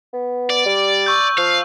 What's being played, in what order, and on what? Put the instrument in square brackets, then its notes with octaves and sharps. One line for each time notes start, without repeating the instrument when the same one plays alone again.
[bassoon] B3
[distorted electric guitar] D5
[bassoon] G3
[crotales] C#6 E6 G6
[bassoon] F3 [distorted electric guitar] F5